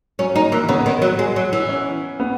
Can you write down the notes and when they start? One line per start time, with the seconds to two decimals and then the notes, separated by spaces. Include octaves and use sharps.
0.19 F#3 C#4
0.35 A#3 D#4
0.52 E3 A#3
0.69 C#3 B3
0.86 D#3
1.02 F#3
1.19 G#3
1.36 F#3
1.53 E3
1.69 C#4
2.20 B3